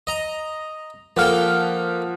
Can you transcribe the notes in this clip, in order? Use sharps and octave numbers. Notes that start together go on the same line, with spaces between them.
D#5 A#5
F3 A#3 A4 F#5 G5 F6